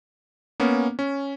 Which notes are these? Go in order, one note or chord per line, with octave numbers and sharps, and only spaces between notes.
A#3 B3 C#4
C#4